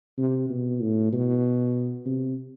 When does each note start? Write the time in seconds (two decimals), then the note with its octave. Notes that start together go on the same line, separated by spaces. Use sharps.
0.18 C3
0.50 B2
0.81 A2
1.12 B2
2.05 C3